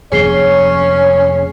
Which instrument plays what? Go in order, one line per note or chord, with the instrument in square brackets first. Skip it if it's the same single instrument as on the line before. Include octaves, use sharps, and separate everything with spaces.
[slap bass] F1 F3 A#3 [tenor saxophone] C#4 [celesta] G#4 C7 G7 [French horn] C#5